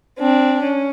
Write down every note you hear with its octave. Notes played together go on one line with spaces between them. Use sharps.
C4 D4
C#4